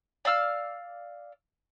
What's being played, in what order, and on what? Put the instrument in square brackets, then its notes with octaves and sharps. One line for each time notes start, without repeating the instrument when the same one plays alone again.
[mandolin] D5 F5 E6 F6